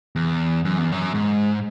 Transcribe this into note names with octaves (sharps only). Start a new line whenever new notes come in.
E2
F#2
E2
F#2
G#2